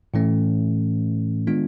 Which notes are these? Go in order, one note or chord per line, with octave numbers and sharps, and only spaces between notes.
A2 E3 A3 C#4
D#3 G#3 B3 D4 F4